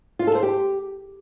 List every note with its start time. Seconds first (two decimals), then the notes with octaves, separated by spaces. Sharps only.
0.19 F4
0.27 A4
0.35 C5
0.43 G4